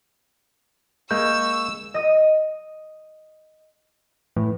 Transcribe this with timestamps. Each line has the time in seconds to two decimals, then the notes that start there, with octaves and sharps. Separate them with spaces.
1.11 G#3 A#3 C#6 E6 G6 E7
1.94 D#5 D#6
4.36 A2 E3